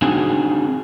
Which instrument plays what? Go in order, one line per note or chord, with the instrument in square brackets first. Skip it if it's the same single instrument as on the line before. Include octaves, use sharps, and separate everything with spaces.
[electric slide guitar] C4 D4 D#4 F#4 G#4 G#5